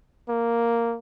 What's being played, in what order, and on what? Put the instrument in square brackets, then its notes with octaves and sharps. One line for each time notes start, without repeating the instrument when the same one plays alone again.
[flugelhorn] A#3